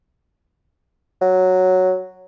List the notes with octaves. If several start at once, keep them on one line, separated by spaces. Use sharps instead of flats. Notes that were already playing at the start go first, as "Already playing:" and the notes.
F#3